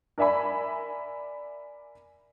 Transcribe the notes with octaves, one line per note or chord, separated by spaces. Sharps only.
A#4 D5 E5 G#5 B5